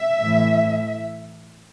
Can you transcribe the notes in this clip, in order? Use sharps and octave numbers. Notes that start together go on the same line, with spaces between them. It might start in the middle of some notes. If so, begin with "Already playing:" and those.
Already playing: E5
A2 E3